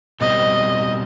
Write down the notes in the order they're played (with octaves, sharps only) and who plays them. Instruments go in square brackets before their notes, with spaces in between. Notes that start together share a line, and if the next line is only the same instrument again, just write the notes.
[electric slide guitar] B2 G3 C4 [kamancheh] D#5